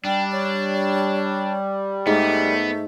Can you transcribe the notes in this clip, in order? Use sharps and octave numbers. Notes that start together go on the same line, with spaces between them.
G3 D4 G5
C#5
G#2 A3 B3